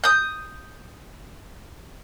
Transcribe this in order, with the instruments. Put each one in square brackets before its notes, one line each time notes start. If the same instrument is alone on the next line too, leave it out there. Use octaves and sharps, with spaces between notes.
[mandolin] D#6 G6